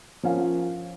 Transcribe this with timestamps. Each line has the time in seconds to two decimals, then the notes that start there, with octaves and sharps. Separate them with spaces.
0.23 F3 C#4 A#4 F5